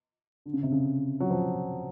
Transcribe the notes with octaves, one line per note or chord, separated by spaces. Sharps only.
D3
C#3
C3
C#3
F#3
F3